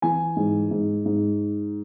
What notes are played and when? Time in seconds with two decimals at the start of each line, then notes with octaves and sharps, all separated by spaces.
0.02 E3 G#5
0.37 G#2
0.71 G#2
1.06 G#2